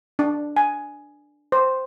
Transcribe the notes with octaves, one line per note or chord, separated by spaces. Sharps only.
D4
G#5
C5